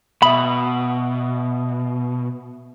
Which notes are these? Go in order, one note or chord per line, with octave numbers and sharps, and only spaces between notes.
B2 E5 B5 D#6